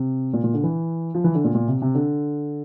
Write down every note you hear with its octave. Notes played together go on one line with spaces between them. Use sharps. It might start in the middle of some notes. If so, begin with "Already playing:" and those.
Already playing: C3
A#2
A#2
D3
E3
F3
E3
D3
A#2
A#2
C3
C3
D3